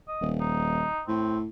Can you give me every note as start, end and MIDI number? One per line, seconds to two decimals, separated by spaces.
0.08 0.28 75
0.21 0.87 27
0.41 1.01 63
1.08 1.49 45
1.08 1.37 60